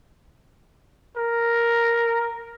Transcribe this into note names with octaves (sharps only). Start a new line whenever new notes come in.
A#4